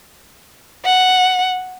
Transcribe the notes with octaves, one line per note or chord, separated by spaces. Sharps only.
F#5